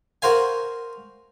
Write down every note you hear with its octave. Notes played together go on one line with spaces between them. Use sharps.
F#4 A#4 C5 F5 G#5